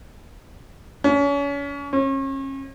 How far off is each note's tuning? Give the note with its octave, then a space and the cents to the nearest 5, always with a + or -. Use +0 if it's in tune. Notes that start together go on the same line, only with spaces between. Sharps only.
C#4 +35
C#4 -35